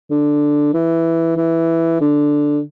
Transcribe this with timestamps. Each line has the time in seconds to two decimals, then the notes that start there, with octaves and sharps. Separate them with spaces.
0.11 D3
0.74 E3
1.37 E3
2.01 D3